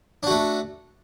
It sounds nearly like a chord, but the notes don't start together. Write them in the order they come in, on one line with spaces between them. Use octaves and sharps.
D4 F#4 A3